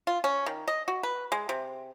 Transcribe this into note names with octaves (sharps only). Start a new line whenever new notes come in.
F4
C#4
D#3
D#5
F#4
B4
G#3
C3